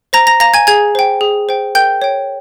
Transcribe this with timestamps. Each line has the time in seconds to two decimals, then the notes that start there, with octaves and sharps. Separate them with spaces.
0.13 C5 A#5 A#6
0.27 A#5 A#6
0.40 F5 A#5 A#6
0.54 G#5 G#6
0.67 G#4 G#5 G#6
0.95 C5 G5
1.21 G#4
1.49 C5 G5
1.75 A#4 G5 G6
2.02 C#5 G5